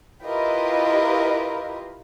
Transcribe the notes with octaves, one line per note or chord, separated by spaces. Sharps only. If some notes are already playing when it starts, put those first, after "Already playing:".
E4 F4 G4 A#4 B4 D#5